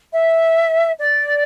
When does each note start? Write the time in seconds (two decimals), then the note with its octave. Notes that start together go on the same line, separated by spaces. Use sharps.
0.13 E5
1.00 D5